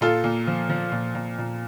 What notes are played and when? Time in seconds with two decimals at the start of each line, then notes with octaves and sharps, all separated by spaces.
0.01 A#2 F4 A4
0.24 A#2
0.47 F3
0.69 F3
0.92 A#2
1.15 A#2
1.38 A#2